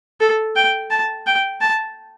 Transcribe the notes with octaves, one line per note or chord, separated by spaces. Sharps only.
A4
G5
A5
G5
A5